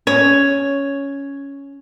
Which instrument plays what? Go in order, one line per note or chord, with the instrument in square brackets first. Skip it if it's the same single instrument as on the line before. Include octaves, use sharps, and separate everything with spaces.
[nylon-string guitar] C#4 [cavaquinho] C#5